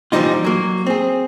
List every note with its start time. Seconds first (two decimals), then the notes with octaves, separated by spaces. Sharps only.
0.12 A#2 E3 F3 G3 D#4 F4
0.45 F#3 A#3
0.86 C4 G#4